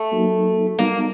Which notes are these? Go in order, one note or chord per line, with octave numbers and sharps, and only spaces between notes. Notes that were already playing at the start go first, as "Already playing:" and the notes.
Already playing: A3
F#3 A#3 D#4 F#4
G3 A#3 B3 D#4 F#4